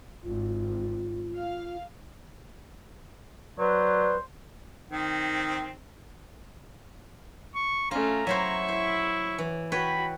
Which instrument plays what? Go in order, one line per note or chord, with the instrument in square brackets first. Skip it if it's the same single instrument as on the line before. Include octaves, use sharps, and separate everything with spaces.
[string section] G#1 [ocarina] F4
[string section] F5
[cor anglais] F#3 [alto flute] B4 [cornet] C5 [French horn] D5
[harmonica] D#3 C4
[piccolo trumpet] C#6
[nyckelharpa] A3 C#4 [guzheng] F4 [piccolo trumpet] A#5
[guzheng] F#3 E4 C5 [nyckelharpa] E5 C#6
[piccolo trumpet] E4 [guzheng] C5
[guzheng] E3
[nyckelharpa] F#4 [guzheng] B4 C#5 G5 [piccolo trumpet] B5